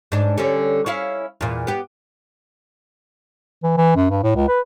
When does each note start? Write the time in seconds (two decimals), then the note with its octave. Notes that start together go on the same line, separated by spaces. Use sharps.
0.12 G#2 D4
0.38 D3 G3 C#4
0.86 C#4 E4 F5
1.41 E2 A#2
1.67 B3 G4
3.63 E3
3.77 E3
3.96 F#2
4.10 G2
4.23 A2
4.35 C#2
4.48 B4